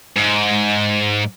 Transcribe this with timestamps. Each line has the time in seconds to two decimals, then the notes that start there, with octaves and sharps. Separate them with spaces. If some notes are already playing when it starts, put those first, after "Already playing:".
0.16 G#2